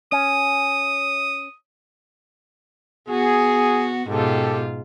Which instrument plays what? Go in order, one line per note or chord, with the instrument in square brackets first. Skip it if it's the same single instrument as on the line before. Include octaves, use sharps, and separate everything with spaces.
[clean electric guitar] C#4 [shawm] D#6
[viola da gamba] B3 F#4 [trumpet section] G#4
[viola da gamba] G#2 B2 F4 [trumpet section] G4 A4